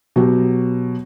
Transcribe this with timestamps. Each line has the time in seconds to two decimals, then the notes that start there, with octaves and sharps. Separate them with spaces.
0.16 B2 F#3 G4